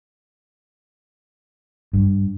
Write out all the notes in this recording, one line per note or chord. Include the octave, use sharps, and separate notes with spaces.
G2